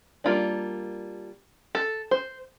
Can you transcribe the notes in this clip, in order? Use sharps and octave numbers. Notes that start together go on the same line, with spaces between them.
G3 A#3 D4 F4
A4
C5